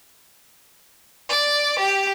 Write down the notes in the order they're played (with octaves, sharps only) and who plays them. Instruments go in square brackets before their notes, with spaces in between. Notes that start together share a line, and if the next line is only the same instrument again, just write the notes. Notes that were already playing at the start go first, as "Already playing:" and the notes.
[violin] D5
G4